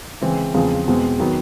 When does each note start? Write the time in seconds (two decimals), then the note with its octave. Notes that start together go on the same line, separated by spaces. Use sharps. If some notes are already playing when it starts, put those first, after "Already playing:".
0.22 C#3 E3 G#3 C4
0.54 E2 C#3 F3 G#3 C4
0.88 E2 B2 G#3 C4
1.19 D#3 F#3 B3